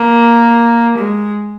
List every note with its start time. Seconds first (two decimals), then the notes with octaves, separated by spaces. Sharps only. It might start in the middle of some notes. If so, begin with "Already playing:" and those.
Already playing: A#3
0.98 G#3